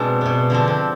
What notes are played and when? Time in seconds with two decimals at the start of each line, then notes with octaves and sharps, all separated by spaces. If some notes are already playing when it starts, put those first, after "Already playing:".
Already playing: B2 G#3 C4 D4
0.21 B2 B3
0.50 D3 F3 C4 D4
0.67 C4